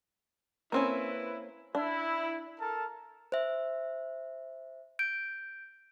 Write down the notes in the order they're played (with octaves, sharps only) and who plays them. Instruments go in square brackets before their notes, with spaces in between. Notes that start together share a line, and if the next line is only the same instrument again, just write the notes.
[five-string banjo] A#3 C4 C#4 [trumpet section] E4 B4
[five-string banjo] D4 [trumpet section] E4
[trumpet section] A4 A#4 A5
[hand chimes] C5 E5
G6 D7